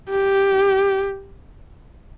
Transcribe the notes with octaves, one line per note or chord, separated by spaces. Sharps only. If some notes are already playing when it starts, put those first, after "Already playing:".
G4